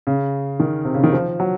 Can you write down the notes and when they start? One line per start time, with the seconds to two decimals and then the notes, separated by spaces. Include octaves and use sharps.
0.07 C#3
0.60 D#3
0.85 C3
0.94 C#3
1.03 D#3
1.13 F3
1.40 F#3